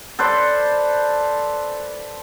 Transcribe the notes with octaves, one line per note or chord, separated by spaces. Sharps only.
A4 B4 C5 D5